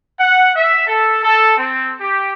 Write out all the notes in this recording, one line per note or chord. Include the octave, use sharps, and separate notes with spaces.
F#5
E5
A4
A4
C4
G4